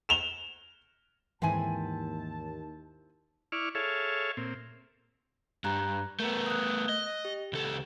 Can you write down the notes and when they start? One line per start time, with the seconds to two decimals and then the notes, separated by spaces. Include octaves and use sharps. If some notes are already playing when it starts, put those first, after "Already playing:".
0.09 E7 F7 G7
1.42 D#2 G#2 D#3 E3 C4 E4 G#5 A5
3.52 E4 D5 C#6 F6
3.75 G#4 A4 C#5 E5 F5
4.37 A#2 C4
5.64 G2 G4 A#5 F#6
6.20 A3 B3 A#4 A#5
6.46 D#6 F#6
6.89 D#5
7.25 G4
7.53 C#2 A4